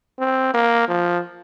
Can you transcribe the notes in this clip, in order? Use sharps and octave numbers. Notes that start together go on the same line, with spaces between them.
C4
A#3
F3